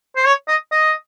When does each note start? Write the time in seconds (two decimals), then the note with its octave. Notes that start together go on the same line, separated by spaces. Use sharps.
0.16 C5
0.26 C#5
0.48 D#5
0.71 D#5